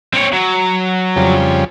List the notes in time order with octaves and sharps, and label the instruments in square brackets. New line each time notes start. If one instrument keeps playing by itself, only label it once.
[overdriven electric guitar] C4 C#5
F#3
[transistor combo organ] F2 C#3 G3